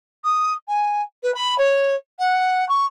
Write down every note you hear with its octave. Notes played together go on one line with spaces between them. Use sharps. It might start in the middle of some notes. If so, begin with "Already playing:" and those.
D#6
G#5
B4
B5
C#5
F#5
C#6